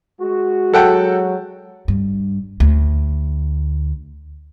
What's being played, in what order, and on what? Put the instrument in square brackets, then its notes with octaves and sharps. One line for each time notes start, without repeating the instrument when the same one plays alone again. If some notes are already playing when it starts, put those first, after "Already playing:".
[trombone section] G#3 F#4
[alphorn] F#3 [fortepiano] A4 F#5 G5
[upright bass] G2
D2